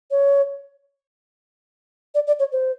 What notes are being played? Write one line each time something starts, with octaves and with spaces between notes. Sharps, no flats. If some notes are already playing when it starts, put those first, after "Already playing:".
C#5
D5
D5
C#5
C5